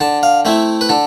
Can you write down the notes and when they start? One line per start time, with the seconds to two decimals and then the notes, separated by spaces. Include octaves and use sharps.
0.01 D3 A5
0.23 F5
0.45 A3 C4 E4 E5
0.81 B4
0.89 D3 A4